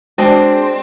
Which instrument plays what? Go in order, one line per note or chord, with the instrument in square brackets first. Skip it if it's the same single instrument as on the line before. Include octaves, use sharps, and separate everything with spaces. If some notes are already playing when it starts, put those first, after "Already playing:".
[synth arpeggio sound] G#3 [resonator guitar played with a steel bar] C4 [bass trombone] D4 [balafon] F#4 C5 A5